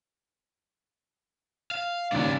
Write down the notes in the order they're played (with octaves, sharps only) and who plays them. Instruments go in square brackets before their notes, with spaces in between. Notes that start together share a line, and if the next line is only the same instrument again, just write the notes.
[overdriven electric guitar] F5
[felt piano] D#2 G#2 [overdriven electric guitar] C#3 D5